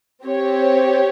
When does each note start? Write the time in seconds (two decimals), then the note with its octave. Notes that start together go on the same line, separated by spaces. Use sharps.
0.24 C4 G4 C#5